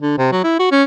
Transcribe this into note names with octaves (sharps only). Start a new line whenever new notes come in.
D3
C3
F#3
E4
F#4
C#4